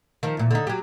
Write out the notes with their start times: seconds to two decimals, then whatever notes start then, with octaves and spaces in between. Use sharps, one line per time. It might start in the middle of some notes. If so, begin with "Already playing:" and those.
0.23 D#3 F3
0.37 E2 A#2
0.51 D3 D#4
0.67 F#3 G4